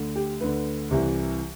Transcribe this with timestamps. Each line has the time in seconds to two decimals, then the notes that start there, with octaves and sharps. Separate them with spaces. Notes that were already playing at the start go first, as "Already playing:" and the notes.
Already playing: D2 D3
0.16 G4
0.41 D2 D3 B4
0.90 C2 C3 E3